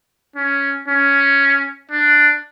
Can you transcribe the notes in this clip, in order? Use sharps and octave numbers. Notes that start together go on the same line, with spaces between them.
C#4
C#4
D4